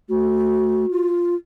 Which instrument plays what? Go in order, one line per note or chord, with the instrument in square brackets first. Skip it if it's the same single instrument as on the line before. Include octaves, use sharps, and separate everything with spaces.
[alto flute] A3 [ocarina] F#4
[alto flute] F4